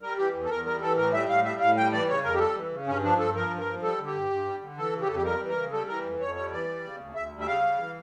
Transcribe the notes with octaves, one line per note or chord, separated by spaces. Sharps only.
G3 A#4
E3 G4
E2
A4
E2 A#4
G3 A#4
E3 A4
A2 A#4
G3 E5
A2 F5
G3 E5
A2 F5
G3 G5
E3 D5
C#3 C#5
F2 A#4
G4
G3 A4
E3
C#3
G2 C#4
F3 D4
G2 A4
F3 A#4
G2
A#4
F3
G3 A4
D3
G4
G2
G2
G3
D3
E3 A4
C#3
G4
F2 A4
G4
G3 A#4
E3
A#4
C#3
G3 A4
E3 A#4
F2
F2 C#5
G3 C#5
E3 D5
G3
C#3
D2
D2 E5
G3
E5
C#3 F5
G3
E3